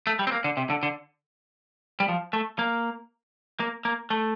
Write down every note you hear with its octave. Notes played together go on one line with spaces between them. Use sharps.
A3
G3
C4
A#3
D3
C3
D3
D3
G3
F3
A3
A#3
A#3
A#3
A3